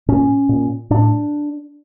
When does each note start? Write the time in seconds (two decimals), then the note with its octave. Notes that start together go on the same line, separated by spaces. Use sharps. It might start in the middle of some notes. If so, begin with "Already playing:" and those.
0.08 A#2 C#4
0.49 A#2
0.90 A2 D4